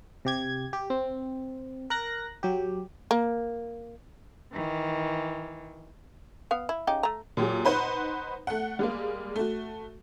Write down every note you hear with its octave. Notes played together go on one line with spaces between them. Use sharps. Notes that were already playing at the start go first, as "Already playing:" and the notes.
C3 G4 G#6
G4
C4
A#4 F#6 A#6
F#3 G4
A#3
D#3 E3
B3 F5
E4
C#3 D#4 G4
A3 A#5
A#2 F#3 G4 G#4
D#4 B4 C5 F#5
A3 F#5
G3 G#3 A#3
A3 F#4